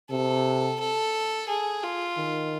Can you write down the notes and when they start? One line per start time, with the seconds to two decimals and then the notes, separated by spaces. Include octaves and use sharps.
0.10 C3 A4
0.80 A4
1.48 G#4
1.83 F4
2.17 D#3